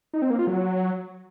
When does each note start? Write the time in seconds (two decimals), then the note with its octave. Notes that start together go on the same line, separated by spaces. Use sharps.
0.13 D#4
0.22 C4
0.30 A#3
0.39 F4
0.47 F#3